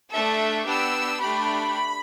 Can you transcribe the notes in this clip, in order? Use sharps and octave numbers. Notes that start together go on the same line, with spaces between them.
A3 D4 A4 E5
B3 D4 G4 E6
A3 D4 G4 B5